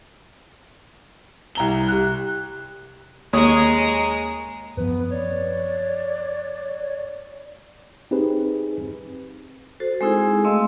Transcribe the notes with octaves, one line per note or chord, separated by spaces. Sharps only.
C2 A#5 G7
G4 F#6
D#2 G#3 C#5 A#5 D#6
F#2 F3 B3 B4
C#5 D5
C4 D#4 G4 G#4 B4
F#4 A4 C5
G#3 C4 D#4 E4 G#4
A3 C4 D#5 F5 C6 E6